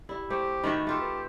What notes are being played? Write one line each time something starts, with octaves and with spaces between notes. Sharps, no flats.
E4 G4 D5
A3 G4 C5
D#3 A3 F#4 B5 A6 C#7
A3 F4 G4 A4
B4